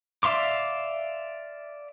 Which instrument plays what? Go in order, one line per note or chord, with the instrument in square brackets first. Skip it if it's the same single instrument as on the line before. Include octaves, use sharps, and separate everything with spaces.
[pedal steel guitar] D5 E5 F5 C6 D6